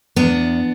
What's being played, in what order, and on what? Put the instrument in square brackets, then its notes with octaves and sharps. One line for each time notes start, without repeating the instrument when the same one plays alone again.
[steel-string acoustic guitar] E2 B3 D4